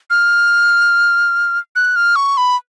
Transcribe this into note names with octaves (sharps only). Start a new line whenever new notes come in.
F6
F#6
F6
C#6
B5